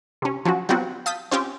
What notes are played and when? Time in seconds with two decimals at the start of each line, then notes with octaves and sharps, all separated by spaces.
0.22 C3 C#4
0.45 F3 F#3 C#4 F#4
0.69 F#3 G3 B3 C4 F4 F#4
1.06 F5 A5 D#6 G6 B6
1.31 C4 C#4 F4 G4 G5 G#5